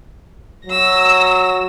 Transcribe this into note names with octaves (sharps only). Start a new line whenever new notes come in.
F#3 E6 A#6